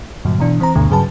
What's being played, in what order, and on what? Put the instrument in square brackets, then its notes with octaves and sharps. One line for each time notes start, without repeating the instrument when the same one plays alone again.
[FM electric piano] G2 A#2 D3 F#3
B2 E3 D4
E3 C4 C5 A#5
D2 G2 B2 D3 A3 B3
G2 C#3 F#3 G#4 B4 A5